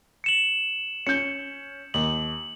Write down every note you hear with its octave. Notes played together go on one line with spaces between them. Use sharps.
C#7 E7 F#7
C#4 G6 C#7
D#2 F#7